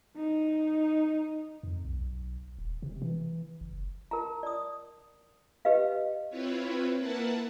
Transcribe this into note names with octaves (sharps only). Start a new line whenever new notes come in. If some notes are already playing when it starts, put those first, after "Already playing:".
D#4
F2
B1
D#1
C3
E3
F#1
A#4 A5 A#5
D5 D#6
G4 B4 D#5 F5
C4 E4 F4 B4 C#5
A#3 E4 A#4 B4 F#5 A5